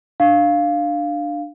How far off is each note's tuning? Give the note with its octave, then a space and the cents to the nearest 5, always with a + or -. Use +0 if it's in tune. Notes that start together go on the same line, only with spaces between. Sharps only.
D4 +15 F5 +0